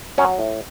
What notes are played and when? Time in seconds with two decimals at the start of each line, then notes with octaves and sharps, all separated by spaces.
0.18 F#3 C#4
0.39 A2